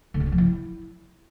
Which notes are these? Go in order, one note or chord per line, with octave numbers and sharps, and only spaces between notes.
D3
C#4
D4
F3
E4